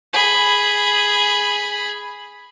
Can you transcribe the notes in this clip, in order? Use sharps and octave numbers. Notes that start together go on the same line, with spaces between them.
G#4 B5